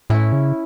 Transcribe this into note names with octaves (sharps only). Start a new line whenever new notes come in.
A2 C#4 E4
C#3